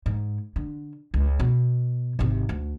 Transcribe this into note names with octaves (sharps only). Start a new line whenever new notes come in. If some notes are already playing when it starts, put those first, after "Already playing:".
G#2
D3
C#2
B2
G#1 C3
D2